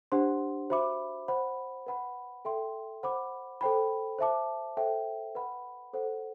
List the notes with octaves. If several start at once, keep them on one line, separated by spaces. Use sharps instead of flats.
D4 G4 C5 F#5 C6
F#4 C5 E5 B5 D6
C5 F#5 B5
B4 F#5 B5
A4 E5 G5 C6
C5 F#5 B5 D6
A4 C5 G5 B5
C5 E5 A5 D6
A4 C5 E5 G5
B4 F#5 B5
A4 C5 F#5